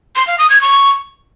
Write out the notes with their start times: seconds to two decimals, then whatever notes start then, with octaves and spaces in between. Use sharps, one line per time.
0.16 C6
0.27 F5
0.39 D#6
0.50 G#6
0.61 C#6